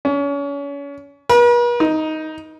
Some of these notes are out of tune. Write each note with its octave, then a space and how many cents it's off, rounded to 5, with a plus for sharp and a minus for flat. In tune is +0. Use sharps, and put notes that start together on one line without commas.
C#4 +35
B4 -45
D#4 +10